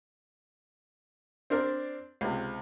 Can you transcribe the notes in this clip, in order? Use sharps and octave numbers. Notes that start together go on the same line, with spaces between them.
C4 D4 A#4 D5
C#2 C3